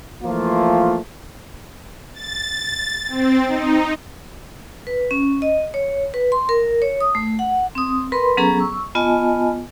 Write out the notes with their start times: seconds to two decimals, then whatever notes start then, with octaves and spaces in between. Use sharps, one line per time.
0.23 E3 F3 A3 A#3 F4
2.13 A6
3.08 C4
3.48 D#4
4.87 B4
5.11 C#4
5.42 D#5
5.74 C#5
6.14 B4
6.32 C6
6.49 A#4
6.82 C#5
7.01 D#6
7.15 A3
7.39 F#5
7.75 C4 D#6
8.12 A#4 B4 B5 C6
8.37 F#3 B3 C#4 G#4 A4 A#5
8.59 C#6 E6
8.95 B3 F4 D#5 G#5 A5